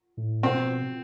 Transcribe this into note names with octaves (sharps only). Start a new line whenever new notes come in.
A2
B2 C4